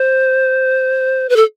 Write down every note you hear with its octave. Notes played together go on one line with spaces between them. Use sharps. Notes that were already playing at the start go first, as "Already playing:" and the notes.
Already playing: C5
B4
A4